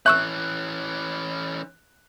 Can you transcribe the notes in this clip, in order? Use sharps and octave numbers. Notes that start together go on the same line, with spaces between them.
E3 C#4 E5 C#6 E6 F#6